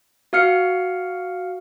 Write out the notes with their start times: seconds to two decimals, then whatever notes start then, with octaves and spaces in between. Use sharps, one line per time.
0.33 F#4 F5 F6 C#7